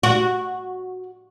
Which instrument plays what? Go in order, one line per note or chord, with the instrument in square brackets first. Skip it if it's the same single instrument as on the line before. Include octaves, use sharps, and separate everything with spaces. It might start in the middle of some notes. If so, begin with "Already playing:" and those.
[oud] F#4